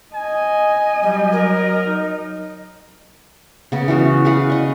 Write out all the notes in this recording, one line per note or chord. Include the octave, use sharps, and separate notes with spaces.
D#5 G#5
F#3 G3
A#4
D#4
C#3 B3
E3 C#4 F#4
G#4 B4 F5 F#5
D#5 C#6